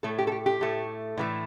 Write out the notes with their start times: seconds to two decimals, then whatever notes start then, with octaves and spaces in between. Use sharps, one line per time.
0.03 A2 A3 A4
0.18 G4
0.27 A4
0.32 G4
0.46 G4
0.61 A2 A3
1.17 A2 E3 A3